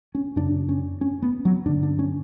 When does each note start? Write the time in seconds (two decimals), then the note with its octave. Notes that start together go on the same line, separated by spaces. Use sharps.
0.15 C#4
0.36 F#2 C#3 D4
0.69 C#4
1.01 C#4
1.22 B3
1.45 F#3
1.65 G2 D3 D4
1.83 D4
1.99 C#4